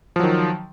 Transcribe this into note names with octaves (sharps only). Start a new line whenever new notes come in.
D#3 F3 F#3